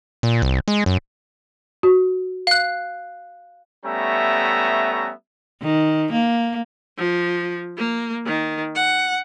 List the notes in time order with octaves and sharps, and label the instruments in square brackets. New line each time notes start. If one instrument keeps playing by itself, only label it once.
[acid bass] A#2
C2
G#3
F#2
[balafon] F#4
[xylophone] F5 F#6
[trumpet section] G3 A3 B3 C#4 E5 A#5
[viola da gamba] D#3
A#3
[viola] F3
A#3
D#3
F#5